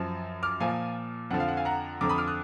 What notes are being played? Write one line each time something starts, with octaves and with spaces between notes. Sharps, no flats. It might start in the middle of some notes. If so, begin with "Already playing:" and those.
Already playing: F#2 F3
D6 F6
A#2 F3 F5 G#5
F2 D3 F3 F#5
F5
F#5
F5 G#5
F#5 A#5
F2 D3 F3 A#5 D6
B5 D#6
D6 F6
D#6 F#6